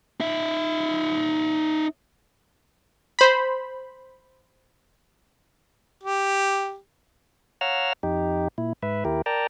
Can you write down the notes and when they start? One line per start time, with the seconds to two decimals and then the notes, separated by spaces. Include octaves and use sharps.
0.20 D#4 E5
3.19 C5 B5
6.04 G4
7.61 C#5 F5 F#5 A#5 E6 F6
8.03 F2 D#4 G4
8.58 A#2 E4
8.83 G#2 B4 E5
9.05 D#2 E4 G4 A#4
9.26 A#4 D5 G5 A5 A#5